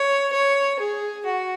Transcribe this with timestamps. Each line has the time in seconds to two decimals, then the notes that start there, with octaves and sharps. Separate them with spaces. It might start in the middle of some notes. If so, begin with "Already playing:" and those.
Already playing: C#5
0.32 C#5
0.79 G#4
1.25 F#4